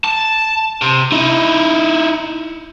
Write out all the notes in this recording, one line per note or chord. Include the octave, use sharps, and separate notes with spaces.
A5
C3
D#4 E4